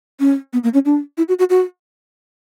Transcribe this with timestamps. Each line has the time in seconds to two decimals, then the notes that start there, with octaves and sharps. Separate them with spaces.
0.20 C#4
0.53 B3
0.64 A#3
0.74 C#4
0.85 D4
1.18 E4
1.29 F#4
1.39 F#4
1.50 F#4